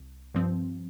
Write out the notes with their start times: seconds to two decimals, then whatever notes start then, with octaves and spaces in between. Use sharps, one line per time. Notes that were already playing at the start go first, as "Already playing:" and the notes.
Already playing: C2
0.34 G2 F3 C4